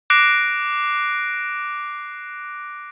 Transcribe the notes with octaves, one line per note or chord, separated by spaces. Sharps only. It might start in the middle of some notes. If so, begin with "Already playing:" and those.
D6 F#6 A#6 C7 D7 F7